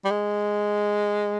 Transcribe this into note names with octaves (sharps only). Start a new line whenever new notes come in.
G3
G#3